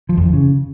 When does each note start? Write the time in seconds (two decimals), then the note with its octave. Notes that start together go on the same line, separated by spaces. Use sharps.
0.09 F3
0.17 F2
0.25 E3
0.33 C#3